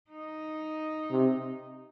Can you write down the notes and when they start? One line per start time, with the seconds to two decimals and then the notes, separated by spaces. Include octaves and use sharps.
0.10 D#4
1.11 C3